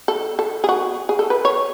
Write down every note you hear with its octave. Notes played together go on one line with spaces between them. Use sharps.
A4
A4
G#4
F#4
G#4
A4
B4
C#5